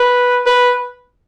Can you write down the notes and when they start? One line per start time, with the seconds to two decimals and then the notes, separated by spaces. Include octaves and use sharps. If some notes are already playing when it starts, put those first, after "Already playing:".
Already playing: B4
0.46 B4